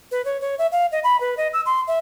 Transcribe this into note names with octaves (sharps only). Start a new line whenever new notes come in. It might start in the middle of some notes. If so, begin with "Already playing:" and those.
B4
C#5
C#5
E5
F5
D#5
B5
B4
D#5
E6
C6
E5